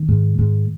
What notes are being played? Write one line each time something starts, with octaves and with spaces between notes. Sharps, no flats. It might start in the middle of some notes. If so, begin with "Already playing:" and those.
Already playing: D#3
G#2
G#2